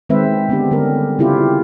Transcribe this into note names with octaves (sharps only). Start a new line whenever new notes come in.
D#3 G#3 C4 B4 C5 E5
D3 B3 C4 D4 G4
D3 G3 B3 C#4 A#4
C#3 C4 E4 F4 G4